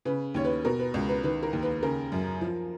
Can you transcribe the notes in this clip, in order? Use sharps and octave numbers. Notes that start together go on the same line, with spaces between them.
C#3 B4
D#2 C#5
B4
B2 A#4
B4
C#2
B4
D#3 B4
A#4
D#2
B4
C#3 A#4
F#2
F3